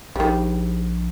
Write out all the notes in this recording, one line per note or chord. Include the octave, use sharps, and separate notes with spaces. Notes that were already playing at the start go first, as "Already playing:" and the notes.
A#1 D#3 G3